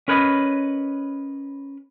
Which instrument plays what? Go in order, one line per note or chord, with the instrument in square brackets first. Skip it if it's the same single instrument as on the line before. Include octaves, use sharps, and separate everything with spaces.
[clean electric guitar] C#4 A#4 B4 C#5 D#5 B5